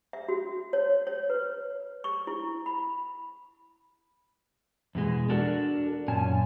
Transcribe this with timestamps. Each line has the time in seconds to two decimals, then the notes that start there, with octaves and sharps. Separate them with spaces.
0.13 E5
0.29 F#4
0.73 C#5
1.07 C#5
1.30 B4
2.04 C#6
2.27 E4
2.66 B5
4.95 E2 B2 G#3
5.29 D4 F#4 A4 A#4
6.08 F#2 A#2 C#4 G#5 A5